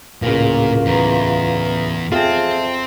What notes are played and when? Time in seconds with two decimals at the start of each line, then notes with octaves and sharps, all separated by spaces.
0.22 D1 A#2 C#3 F4 A#4
0.86 E2 B4 A#5
2.12 F2 C4 F4 G#4 E5 G5 A5